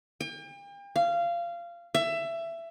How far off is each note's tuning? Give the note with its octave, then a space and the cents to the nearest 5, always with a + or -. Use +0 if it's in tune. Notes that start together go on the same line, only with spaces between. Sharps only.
G5 +40
F5 -20
E5 +20